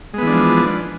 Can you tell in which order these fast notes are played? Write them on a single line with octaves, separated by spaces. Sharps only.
G#3 B3 E3 D4 F3